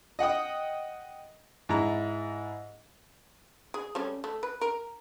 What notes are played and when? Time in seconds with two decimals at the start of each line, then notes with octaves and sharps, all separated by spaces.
0.19 D#5 F#5 G5 D#6
1.69 G#2 E4 A#5
3.74 G#4
3.95 G3 A3 C#4
4.24 A3
4.43 B4
4.61 A#4